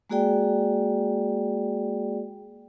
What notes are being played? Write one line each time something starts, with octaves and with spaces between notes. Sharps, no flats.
G#3 A#3 F#4 G#4 D5 G5